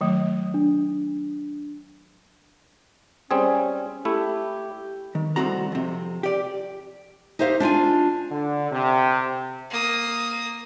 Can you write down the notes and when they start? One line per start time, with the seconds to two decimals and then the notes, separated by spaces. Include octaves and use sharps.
0.01 D#3 F#3 A3
0.54 D4
3.31 G3 C4 C#4 G#4
4.05 A3 E4 G4
5.15 D#3
5.36 C2 F#2 A2 C4 F#4 A#5
5.72 F2 C3
6.23 G4 D5
7.39 D#4 G4 C5 E5 F5
7.60 D4 E4 F4 G#5
8.31 D3
8.72 C3
9.70 A#3 D#6